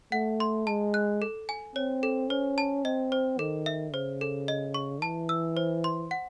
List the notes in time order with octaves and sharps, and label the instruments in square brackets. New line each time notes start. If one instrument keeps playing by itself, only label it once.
[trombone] A3 [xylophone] F#5
[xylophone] C6
[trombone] G#3 [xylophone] A5
[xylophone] F#6
A4
G#5
[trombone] C4 [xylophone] C#5
[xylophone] A4
[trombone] C#4 [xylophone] C5
[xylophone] A5
[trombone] C4 [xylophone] D#5
[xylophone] C5
[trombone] D#3 [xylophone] A4
[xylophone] E5
[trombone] C#3 [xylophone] C5
[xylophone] A4
D#5
C#6
[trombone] E3 [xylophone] A5
[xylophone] E6
C5
C6
F#5